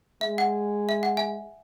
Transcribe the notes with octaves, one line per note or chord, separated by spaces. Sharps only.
G#3 E5
F#5
E5
F#5
E5 G#5